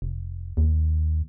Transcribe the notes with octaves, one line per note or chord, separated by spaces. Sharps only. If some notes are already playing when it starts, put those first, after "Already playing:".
F1
D#2